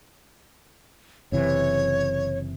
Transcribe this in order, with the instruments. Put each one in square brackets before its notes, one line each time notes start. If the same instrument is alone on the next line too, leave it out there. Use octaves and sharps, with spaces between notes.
[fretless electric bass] F#1 C3 E3 [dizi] C#5